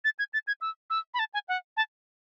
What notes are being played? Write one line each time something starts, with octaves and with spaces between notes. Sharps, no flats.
A6
G#6
A6
G#6
E6
E6
B5
A5
G#5
F#5
A5